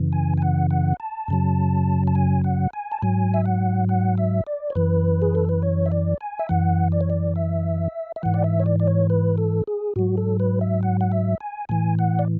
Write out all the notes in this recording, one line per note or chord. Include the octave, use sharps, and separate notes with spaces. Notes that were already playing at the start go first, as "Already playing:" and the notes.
Already playing: F#2 C#3 E3
G#5
G#5
F#5
F#5
A5
F#2 C#3 F#3
A5
G#5
F#5
G#5
A5
G#2 F#3 G#5
E5
F#5
F#5
E5
D5
C#5
F#2 E3 B4
G#4
A4
B4
C#5
E5
D5
G#5
E5
F#2 E3 F#5
D5
C#5
D5
E5
E5
G#2 E3 F#5
D5
E5
C#5
D5
D5
C#5
B4
A4
G#4
G#2 F#3 F#4
A4
B4
E5
F#5
F#5
E5
G#5
A2 E3 G#5
F#5
D5